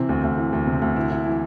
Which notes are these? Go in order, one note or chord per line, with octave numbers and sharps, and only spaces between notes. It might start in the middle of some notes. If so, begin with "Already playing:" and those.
Already playing: C3 E3 C4
D2
D2
E3
D2
C3
D2
E4
E4
E3